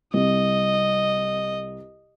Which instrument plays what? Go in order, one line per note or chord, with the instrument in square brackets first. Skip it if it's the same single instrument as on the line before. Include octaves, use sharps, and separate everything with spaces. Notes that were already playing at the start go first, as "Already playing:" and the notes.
[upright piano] C2 [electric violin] D#5